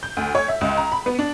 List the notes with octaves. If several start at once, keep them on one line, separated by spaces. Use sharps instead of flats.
G6
D2
C#5
E5
C#2
A#5
B5
B3
D4